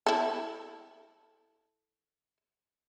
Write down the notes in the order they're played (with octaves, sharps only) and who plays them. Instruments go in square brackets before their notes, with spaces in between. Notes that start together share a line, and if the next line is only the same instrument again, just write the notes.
[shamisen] E4 A4